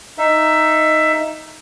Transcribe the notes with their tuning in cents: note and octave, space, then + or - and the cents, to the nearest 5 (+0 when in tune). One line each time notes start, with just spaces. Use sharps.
D#4 +0 E5 +10